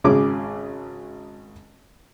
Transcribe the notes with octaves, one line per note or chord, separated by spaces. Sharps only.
G#1 C#3 C#4 G#4 D6